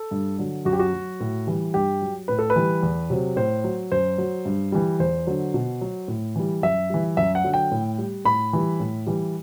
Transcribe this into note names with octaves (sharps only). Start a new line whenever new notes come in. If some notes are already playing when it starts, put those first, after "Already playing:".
Already playing: A4
G2
D3 F#3
F#2 F#4
G4
F#4
F#3
A2
E3 G3
G2 G4
F#3
A2 B4
A4
B4
E3 G3
E2
C3 F#3
A2 C5
F#3
F#2 C5
F#3
G2
E3 G3
E2 C5
D3 F#3
B2
F#3
A2
E3 G3
F#2 E5
E3 G3
F#2 E5
F#5
D3 F#3
G5
A2
G3
A2 B5
E3 G3
A2
E3 G3